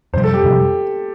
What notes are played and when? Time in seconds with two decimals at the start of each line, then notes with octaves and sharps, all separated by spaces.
0.14 F2 C3 G3 C5
0.23 A4
0.34 G4
0.44 F2 C3 G3